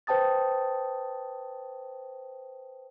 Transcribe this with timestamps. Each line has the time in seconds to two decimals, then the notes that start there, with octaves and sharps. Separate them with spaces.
0.07 B4 C5 G5 A5 D#6 A6